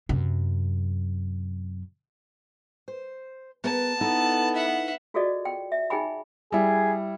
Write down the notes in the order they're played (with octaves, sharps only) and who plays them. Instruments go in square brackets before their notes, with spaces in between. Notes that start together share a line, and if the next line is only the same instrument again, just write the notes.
[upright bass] F#2 C3
[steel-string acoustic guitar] C5
[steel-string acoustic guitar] B3 G#4 A#4 [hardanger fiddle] A5
[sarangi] B3 [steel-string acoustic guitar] D#4 E4 A4
[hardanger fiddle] E5 F#5
[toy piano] F4 F#4 G#4 A4 D5 D#5
G5
E5
D#4 G#4 G5 G#5 B5
[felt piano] G3 E4 [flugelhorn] G#4